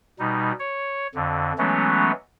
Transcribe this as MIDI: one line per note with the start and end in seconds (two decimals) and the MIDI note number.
0.19 0.52 47
0.19 0.52 55
0.19 0.52 63
0.59 1.07 73
1.15 1.53 41
1.15 1.53 50
1.58 2.11 52
1.58 2.11 54
1.58 2.11 56
1.58 2.11 57
1.58 2.11 59
1.58 2.11 61